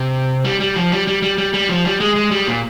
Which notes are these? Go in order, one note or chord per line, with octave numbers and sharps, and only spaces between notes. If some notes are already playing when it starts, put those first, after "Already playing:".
Already playing: C3
G3
G3
F3
G3
G3
G3
G3
G3
F3
G3
G#3
G#3
G3
A#2